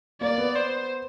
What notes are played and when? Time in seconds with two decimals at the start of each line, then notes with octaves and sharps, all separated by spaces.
0.21 A#3 D5
0.38 B3
0.56 C5